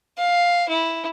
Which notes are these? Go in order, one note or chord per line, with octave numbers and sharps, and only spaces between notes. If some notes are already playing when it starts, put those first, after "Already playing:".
F5
E4